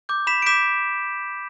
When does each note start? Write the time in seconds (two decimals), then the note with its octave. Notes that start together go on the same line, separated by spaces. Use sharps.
0.09 D6 G6
0.27 B5 B6 E7
0.42 D7
0.46 D6 G6 B6 E7